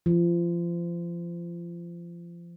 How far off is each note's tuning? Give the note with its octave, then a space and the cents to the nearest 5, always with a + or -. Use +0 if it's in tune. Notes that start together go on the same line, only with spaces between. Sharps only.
F3 -30